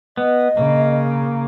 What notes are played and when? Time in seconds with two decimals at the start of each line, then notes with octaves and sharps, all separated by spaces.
0.17 B3 D#5
0.57 C#3 A#3